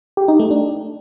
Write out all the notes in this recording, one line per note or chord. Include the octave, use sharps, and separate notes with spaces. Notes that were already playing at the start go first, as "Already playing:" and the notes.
G4
D#4
A3
D4